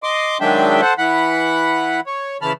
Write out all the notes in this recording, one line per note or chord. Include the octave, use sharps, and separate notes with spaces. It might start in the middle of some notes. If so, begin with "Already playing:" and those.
D#5 C6 D6
D#3 F#3 G#3 D4 E5 G5
A4 C5 F#5
E3 F#5 B5
C#5
C#3 E3 A5 B5 F6